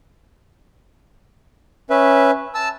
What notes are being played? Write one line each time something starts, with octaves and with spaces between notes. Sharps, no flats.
C#4 B4 E5
A5 E6